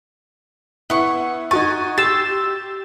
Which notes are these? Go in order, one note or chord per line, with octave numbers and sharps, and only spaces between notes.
B3 E4 C#6
D#4 F#4 G#5 C#6 A6
G4 C6 E6 A6